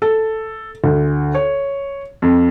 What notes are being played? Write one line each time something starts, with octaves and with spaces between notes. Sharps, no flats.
A4
D2
C#5
F2